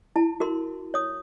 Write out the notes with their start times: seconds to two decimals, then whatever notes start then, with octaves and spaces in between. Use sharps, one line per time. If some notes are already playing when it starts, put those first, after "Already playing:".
0.16 E4 A5
0.40 F#4 A#4 C6
0.94 C#5 D#6